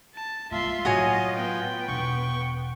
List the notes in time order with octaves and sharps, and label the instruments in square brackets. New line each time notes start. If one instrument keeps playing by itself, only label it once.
[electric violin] A5
[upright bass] G#3 A#3 [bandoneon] F4 [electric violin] E5 C6
[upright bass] A2 F#3 [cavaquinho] F#4 C#5 G#5 [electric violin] D#5
[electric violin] B3 G5
[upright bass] E1 [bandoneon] C#6